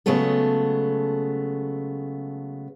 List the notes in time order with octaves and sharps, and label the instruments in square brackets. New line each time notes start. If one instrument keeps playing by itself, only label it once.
[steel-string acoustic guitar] C#3 F#3 G#3 A3 B3 A4